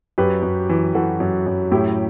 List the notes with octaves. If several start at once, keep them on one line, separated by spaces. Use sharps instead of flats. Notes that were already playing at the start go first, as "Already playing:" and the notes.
F#2 G4 B4
F#2
E3
E3 F#4 A4
F#2
F#2
A2 E4 G4